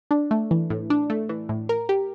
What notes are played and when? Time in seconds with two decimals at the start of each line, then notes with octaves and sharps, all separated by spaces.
0.11 D4
0.31 A3
0.51 E3
0.70 A2
0.90 D4
1.10 A3
1.29 E3
1.49 A2
1.69 A#4
1.89 G4